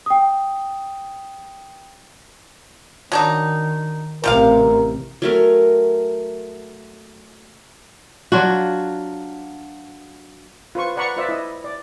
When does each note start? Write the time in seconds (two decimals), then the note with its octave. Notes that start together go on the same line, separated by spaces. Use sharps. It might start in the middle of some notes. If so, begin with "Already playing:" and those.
0.06 G5 D#6
3.12 D#3 F#3 D4 D#4
4.24 A1 C3 G3 F4 A#4 F5
5.22 F#3 A3 A#4
8.32 F#3 D4 F4 F#4
10.75 F4 B4 C5 C#6
10.96 B4 D5 F#5 A#5 B5 C#6
11.17 F4 B4 C5 D5 E5
11.29 E4 D#5
11.64 D5